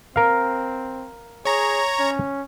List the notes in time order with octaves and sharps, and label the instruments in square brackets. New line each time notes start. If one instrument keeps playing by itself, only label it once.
[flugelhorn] C4 [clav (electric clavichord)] A#4 F5
[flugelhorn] G#4 [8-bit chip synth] C#5 A#5
[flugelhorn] C#4